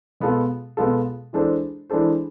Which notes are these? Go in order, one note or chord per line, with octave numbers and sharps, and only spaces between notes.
B2 G#3 B3 F4 A4
B2 G#3 B3 F4 A4
E3 G#3 D4 A4 C5
E3 G#3 D4 A4 C5